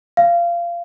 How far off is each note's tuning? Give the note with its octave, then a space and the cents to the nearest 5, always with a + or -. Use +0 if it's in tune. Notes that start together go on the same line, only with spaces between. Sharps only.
F5 -20